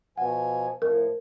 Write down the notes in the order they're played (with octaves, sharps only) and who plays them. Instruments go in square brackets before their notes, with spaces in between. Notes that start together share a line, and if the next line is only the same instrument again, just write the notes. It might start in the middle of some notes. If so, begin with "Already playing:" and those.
[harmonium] B2 F3 G#5 [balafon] F#5
[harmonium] A2 F3 [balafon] A#4